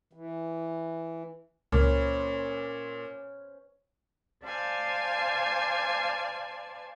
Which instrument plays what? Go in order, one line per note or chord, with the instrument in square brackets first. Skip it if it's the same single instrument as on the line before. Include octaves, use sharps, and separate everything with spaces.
[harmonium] E3
[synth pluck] C#2 [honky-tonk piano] A#2 [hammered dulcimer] C#4 B4 C5
[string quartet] C5 D5 F5 G#5 A5